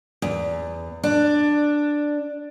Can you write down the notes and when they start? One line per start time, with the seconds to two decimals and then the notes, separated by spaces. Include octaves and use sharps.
0.22 E2
1.04 D4